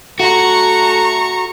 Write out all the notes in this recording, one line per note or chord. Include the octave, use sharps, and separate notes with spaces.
A3 F#4 A#5 C#6